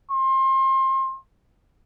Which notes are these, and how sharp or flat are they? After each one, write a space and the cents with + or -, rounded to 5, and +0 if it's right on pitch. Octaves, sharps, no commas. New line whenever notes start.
C6 +30